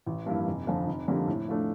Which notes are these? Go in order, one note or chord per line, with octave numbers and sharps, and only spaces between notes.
A1
G2 F3 A#3 E4
F1
F2 D3 F3
F1
F2 D3 G3 A#3
A2
F3 A3 D4